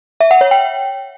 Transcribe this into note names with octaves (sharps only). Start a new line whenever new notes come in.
E5
F#5
C#5
G5